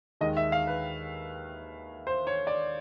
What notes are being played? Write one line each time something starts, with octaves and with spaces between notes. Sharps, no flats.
D#2 D#3 G#3 D#5
E5
F5
B4
C5
C#5
D5